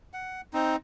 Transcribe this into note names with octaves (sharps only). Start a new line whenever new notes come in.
F#5
C4 D#4